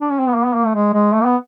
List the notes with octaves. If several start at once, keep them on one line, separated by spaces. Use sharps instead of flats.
D4
C#4
C4
B3
A#3
B3
A#3
A3
G#3
G#3
A3
A#3
B3